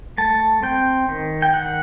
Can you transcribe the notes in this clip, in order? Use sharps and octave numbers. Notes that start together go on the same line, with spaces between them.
A3 A5
C4 G5
D#3
G5
D#3 F#5